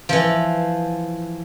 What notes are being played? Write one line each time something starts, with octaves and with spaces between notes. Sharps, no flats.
E3 F3